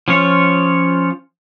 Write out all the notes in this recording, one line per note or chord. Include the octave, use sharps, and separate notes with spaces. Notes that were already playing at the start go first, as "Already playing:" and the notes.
F3 C#4 F4 C#5